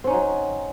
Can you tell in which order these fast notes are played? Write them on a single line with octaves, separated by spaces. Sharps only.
C4 C#4 D#4 F#3